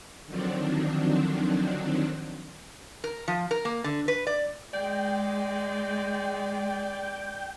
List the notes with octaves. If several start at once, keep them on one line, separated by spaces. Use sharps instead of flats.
D3 D#3 F3 F#3 C4 D4
A#4
F3
A#4
A#3
D3
B4
D5
G#3 D5 G5